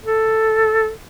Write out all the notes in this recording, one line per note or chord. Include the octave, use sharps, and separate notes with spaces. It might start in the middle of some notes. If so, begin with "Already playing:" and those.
A4